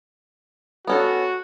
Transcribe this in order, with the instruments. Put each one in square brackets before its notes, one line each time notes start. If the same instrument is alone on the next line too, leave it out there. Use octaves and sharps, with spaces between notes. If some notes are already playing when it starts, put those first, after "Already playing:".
[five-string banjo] B3 C#4 A4 [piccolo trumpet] F#4